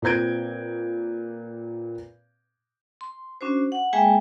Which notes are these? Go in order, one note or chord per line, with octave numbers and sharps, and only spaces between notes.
A#2 C4 B4 G6 G#6 D7
C6
C#4 D4 F#4 C5
F#5
G#3 A#3 G#4 E5 G5 G#5